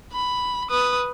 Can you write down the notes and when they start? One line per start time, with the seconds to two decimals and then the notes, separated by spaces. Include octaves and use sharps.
0.13 B5
0.71 B4 D#6